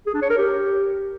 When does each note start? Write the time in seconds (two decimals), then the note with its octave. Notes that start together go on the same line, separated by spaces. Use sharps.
0.07 G#4
0.14 D4
0.22 C#5
0.30 A#4
0.38 G4